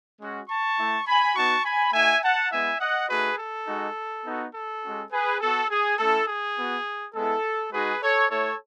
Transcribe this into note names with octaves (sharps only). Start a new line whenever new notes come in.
G#3 C#4 F#4
A5 C#6
A3 E4
G#5 B5
B3 D#4 F#4 A5 C#6
G#5 B5
A3 D#4 F#4 E5 G#5
F#5 A5
G#3 B3 E4 E5 G#5
D#5 F#5
A3 D#4 F#4 G#4 B4
A4
G#3 D#4 F#4
B3 D#4 F#4
A4
G#3 C#4 F#4
G#4 B4
B3 F#4 A4
G#4
A3 C#4 E4 A4
G#4
B3 F#4
G#3 B3 E4 A4
G#3 D#4 F#4 G#4 B4
A4 C#5
A3 E4 A4 C#5